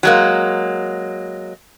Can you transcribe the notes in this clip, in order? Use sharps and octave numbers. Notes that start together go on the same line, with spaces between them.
F#3 G#3 A#3